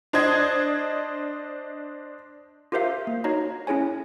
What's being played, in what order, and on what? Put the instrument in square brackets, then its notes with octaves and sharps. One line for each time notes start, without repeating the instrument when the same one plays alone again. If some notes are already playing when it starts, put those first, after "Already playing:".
[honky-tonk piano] D4 C5 D#5 G#6
[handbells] F4 G4 A#4 C5 E5 F5
A#3
D#4 F#4 C#5 D#5 A#5
C#4 E4 G#4 C#5 G#5